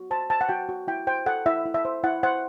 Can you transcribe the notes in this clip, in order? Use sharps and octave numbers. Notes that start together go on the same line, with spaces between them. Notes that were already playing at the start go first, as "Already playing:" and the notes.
Already playing: F#4
C5 A5
C5 A5
F#5
F#4 G5
F#4
E4 G5
C5 G5
A4 F#5
E4 E5
E4
E5
C5
E4 F#5
C5 F#5